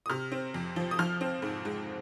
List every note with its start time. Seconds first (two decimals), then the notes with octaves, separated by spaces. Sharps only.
0.06 D#6
0.10 C3 F6
0.32 C4
0.54 F2
0.76 F3
0.91 D#6
0.99 F3 F6
1.21 C4
1.42 G#2
1.65 G#3